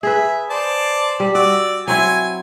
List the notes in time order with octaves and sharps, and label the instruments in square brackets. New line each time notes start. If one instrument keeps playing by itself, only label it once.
[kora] G#4 B4 [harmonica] E5
[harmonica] C5 D5 A5
[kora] G3
[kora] F#4 [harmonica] D5 E6
[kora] F#3 C4 E4 [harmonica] G#5